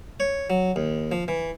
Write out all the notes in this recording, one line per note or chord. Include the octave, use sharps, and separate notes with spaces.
C#5
F#3
D#2
F3
E3